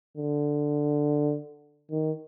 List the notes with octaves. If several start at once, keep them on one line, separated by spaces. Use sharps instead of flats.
D3
D#3